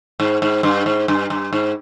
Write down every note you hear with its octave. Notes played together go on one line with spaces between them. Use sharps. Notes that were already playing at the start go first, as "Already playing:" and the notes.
G#2
G#2
G2
G#2
G2
G2
G#2